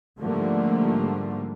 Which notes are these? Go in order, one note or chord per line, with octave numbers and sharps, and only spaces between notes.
G#2 D3 F3 G3 A3 A#3